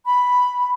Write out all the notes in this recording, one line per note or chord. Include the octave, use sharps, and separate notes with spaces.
B5